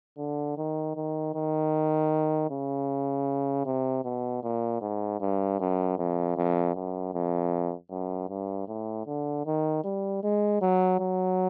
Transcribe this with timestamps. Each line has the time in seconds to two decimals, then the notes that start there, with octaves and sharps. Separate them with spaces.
0.18 D3
0.57 D#3
0.96 D#3
1.35 D#3
2.51 C#3
3.66 C3
4.05 B2
4.43 A#2
4.81 G#2
5.20 G2
5.60 F#2
5.98 F2
6.37 F2
6.75 F#2
7.14 F2
7.91 F#2
8.29 G2
8.68 A2
9.07 D3
9.46 D#3
9.84 G3
10.23 G#3
10.62 F#3
11.00 F#3